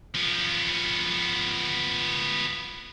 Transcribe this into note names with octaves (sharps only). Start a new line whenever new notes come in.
F3 B3